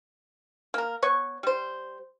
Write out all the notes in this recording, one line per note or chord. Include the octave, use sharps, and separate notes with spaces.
A#3 A#4
B3 C#5 C#6
G3 C5